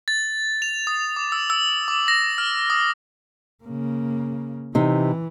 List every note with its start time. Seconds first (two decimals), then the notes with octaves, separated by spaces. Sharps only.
0.08 A6
0.62 F7
0.87 D#6
1.16 D6
1.32 E6
1.50 E6
1.88 D6
2.08 A#6
2.38 F6
2.70 D#6
3.64 C#3 A#3
4.75 C3 E3 D#4